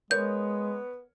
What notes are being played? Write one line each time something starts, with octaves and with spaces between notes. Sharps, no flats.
G#3 B3 A#4 C#5 G6